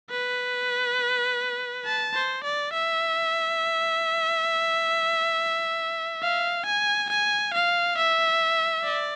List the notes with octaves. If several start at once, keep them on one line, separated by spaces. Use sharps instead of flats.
B4
A5
C5
D5
E5
F5
G#5
G#5
F5
E5
D5